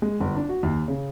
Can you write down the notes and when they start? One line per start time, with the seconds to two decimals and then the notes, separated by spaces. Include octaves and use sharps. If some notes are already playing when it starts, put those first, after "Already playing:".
0.02 G#3
0.21 G1
0.35 D4
0.49 F#4
0.63 D#2
0.88 C#3